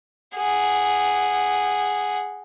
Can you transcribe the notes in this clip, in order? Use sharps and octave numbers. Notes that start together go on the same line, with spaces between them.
G#4 F#5